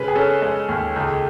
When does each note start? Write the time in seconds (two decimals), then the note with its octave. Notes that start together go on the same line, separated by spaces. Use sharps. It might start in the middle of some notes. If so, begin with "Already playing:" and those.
Already playing: C#3 G#3 B4
0.08 G#4
0.16 C#4 A4
0.42 G#3
0.69 D#2
0.96 C#2